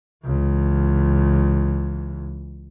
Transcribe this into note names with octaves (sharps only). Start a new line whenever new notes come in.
C#2 E3